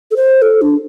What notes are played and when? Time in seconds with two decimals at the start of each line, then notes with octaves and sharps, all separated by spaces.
0.11 A4
0.16 C5
0.42 A4
0.62 D4